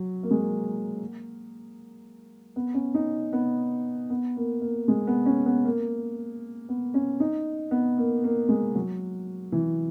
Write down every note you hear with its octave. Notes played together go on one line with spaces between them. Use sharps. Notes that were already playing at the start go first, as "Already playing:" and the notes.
Already playing: F#3
A#3
G#3
A#3
B3
C#4
D#4
B3
B3
A#3
A#3
G#3
B3
C#4
B3
A#3
B3
C#4
D#4
B3
A#3
A#3
G#3
F#3
E3